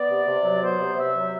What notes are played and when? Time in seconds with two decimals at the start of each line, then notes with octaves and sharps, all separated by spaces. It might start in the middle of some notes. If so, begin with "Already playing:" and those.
Already playing: B3 D5
0.09 C3
0.27 C3
0.44 F#3
0.62 B3 C5
0.80 C3
0.97 C3 E5
1.15 F#3